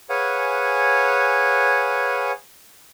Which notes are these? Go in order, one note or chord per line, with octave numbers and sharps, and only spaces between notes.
G#4 B4 C#5 F5 F#5 G#5